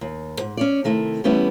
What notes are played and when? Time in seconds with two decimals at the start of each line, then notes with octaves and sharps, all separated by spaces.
0.01 D#2
0.40 G#2
0.57 C#4 C#5 D5
0.84 C3 D#3 A3 E4
1.24 E3 G3 A3 B3 C#4 E4